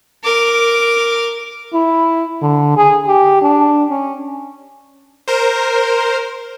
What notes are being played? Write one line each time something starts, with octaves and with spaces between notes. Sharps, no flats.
A#4 D6
E4
D3
G#4
G4
D4
C#4
A#4 C5